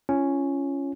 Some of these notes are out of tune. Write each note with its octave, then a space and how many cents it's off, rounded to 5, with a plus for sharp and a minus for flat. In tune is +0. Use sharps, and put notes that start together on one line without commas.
C#4 +0 F4 -35